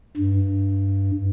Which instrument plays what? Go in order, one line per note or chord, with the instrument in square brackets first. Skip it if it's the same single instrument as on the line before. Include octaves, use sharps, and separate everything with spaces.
[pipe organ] G2